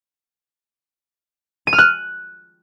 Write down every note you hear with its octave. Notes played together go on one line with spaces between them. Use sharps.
D#7
F6
F#6